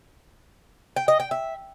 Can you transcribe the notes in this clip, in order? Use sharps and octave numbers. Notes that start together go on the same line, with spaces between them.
G5
D#5
G5
E5